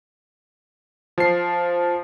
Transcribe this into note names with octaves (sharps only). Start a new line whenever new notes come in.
F3 C7